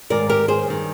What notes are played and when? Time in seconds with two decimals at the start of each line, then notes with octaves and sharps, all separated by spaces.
0.10 G#2 D#3 A#4 D5
0.29 G4 A#4
0.48 G#4 C5
0.67 G2 D#3